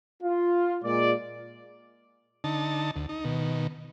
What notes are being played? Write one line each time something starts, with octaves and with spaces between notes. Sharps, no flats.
F4
A#2 G#3 D5
D3 D#4 A5
D2
D#4
B2 D#3